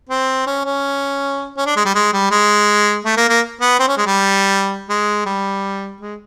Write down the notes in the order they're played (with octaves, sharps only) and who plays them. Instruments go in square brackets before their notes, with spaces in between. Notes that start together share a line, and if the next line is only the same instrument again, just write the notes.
[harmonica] C4
C#4
C#4
C#4
D4
G#3
G3
G#3
G3
G#3
A3
A#3
A#3
B3
C4
C#4
G#3
G3
G#3
G3
G#3